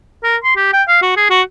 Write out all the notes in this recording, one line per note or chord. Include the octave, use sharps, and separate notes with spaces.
A#4
C6
G4
G5
F5
F#4
G#4
F#4